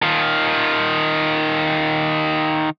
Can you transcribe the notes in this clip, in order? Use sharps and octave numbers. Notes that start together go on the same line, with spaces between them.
D#3 F4